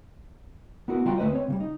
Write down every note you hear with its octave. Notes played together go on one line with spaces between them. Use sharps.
B3 E4 F#4 A#4
C#3 G3 F4 F#4 G5 A#5
D2 A3 B4 C5 D#5
C4 C#5
C#3 E3 G3
D#4